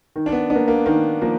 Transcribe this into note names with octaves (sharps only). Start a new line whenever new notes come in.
D#3
D4
B3
B3 D4
A#3
A#3
D#3 A#3
F3 A#3